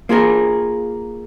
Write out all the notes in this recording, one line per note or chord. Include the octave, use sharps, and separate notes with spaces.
A#3 F4 G#4 A#4